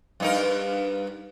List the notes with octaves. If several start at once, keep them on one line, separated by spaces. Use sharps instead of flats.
G2 D#4 A#4